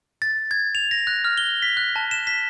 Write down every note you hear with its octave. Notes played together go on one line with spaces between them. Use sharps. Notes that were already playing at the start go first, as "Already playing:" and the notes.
A6
G#6
F7
A#6
F#6
F6
G7
B6
F#6
A5
E7
B6